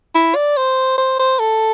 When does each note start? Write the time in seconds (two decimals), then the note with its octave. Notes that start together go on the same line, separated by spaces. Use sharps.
0.15 E4
0.35 D5
0.57 C5
0.98 C5
1.19 C5
1.39 A4